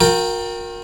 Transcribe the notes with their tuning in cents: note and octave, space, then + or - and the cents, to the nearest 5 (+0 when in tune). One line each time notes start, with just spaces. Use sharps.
F#4 -45 A#4 +0 G5 +0